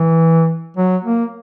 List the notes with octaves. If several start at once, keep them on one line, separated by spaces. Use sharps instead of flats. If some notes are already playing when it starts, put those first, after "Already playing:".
Already playing: E3
F#3
A#3